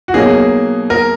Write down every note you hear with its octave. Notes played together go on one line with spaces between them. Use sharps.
F#4
B2 F#3 A#3 D#4 G#4
A#4